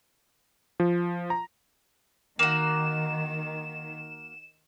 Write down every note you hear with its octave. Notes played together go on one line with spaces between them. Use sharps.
F3
A#5
D#3 A#3 F#4 E7